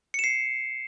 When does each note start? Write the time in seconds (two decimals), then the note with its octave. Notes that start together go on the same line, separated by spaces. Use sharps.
0.14 C#7
0.19 E7
0.24 C7